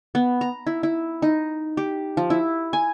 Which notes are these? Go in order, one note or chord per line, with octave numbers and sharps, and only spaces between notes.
B3
A#5
E4
E4
D#4
G4
F3
E4
G#5